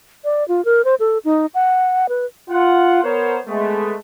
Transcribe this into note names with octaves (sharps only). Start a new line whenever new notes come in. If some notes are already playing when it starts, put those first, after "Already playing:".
D5
F4
A#4
C5
A4
D#4
F#5
B4
F4 F#5
B3 A#4 C5 C#5
G#3 A3 B3